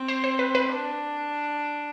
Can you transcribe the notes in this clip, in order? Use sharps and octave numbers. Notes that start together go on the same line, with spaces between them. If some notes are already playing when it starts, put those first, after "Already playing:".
Already playing: C4
C5
C5
B4
B4
D4